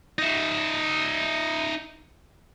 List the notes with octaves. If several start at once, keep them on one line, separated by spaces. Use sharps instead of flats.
D#4 E5